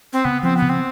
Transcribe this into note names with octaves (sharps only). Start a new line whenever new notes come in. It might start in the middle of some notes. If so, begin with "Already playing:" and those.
C4
C#3 B3
F3 C4
C#3 B3
C4